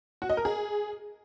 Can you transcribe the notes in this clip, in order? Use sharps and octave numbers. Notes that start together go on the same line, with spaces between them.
F#4
D#5
A#4
G#4